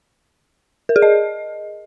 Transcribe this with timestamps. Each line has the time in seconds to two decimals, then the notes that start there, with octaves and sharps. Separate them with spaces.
0.89 A#4
0.96 G#4
1.02 D#5